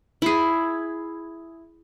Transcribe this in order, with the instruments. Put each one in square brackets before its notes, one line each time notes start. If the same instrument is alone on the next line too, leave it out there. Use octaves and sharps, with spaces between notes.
[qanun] E4 G#4